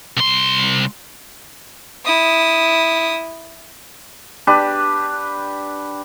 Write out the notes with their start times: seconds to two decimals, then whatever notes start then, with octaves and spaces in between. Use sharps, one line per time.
0.17 C2 C6
2.05 E4 D#6
4.47 D4 G4 B4